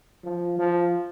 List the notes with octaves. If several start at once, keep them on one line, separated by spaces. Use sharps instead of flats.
F3
F3